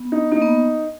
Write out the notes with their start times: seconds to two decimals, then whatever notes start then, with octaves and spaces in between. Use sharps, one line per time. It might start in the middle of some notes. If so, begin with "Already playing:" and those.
Already playing: B3
0.12 D#4
0.32 A#3 D#4
0.42 B3